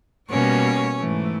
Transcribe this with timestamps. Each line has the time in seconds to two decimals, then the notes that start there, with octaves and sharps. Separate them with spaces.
0.30 B2 G3 A#3 C#4 C#5
0.97 G#2 E3 A3